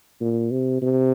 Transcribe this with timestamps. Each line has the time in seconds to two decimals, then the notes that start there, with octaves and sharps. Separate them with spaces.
0.21 A#2
0.51 C3
0.82 C3